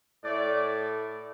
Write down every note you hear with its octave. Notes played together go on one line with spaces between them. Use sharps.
A2 A3 D5